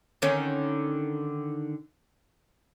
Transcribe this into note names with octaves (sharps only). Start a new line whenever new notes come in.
D3 D#3 C#4